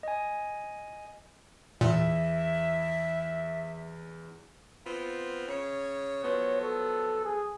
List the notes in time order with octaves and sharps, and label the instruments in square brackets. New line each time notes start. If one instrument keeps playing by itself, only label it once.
[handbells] D#5 G#5
[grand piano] E2 [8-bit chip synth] A#2 [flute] E5
[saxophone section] B3 C4 F4
C#3 C#5
[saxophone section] F3 F#3 B3 [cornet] C#5
[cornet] A4
G#4